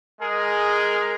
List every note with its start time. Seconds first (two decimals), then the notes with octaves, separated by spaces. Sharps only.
0.22 G#3 G#4 A#4